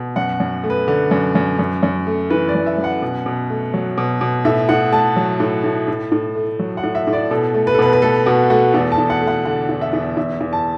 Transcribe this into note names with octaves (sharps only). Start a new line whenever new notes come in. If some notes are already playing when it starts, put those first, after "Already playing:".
Already playing: B2
F#2 F#5
F#2
A3
B4
D3
F#2
F#2
F#2
F#2
A3
E3 B4
D5
F#2
E5
F#2
F#5
B2
B2
A3
F#3
B2
B2
A2 E5
A2 F#5
A3 A5
F#3
A2
A2
A2
A2
A3
F#3
F#5
A2
E5
A2
D5
B2 A4
A3
B4
A4
B2 B4
B4
A3 A4
B2 F#4
A3 F#4
E2 A4
A5
E2
F#5
A3
F#5
D3 F#5
E2
E5
E2
E2 E5
E2
A5